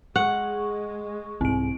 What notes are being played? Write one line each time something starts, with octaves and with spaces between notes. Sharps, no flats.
G#3 F#5 C#6
C2 G#2 C4 D7